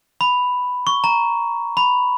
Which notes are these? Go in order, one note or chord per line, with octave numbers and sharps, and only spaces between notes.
B5
C#6
A#5
B5